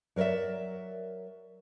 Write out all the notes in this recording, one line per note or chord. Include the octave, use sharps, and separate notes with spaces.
F#3 A#4 C#5 D5 E5